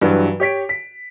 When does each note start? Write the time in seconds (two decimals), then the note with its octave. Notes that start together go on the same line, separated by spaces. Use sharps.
0.02 G2 E3 F#3
0.40 G4 C#5 B6 D7
0.69 B6